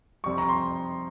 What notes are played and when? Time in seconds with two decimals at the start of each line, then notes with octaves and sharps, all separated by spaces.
0.24 F2 C3 G3 C4 C#6
0.38 A#5
0.49 C6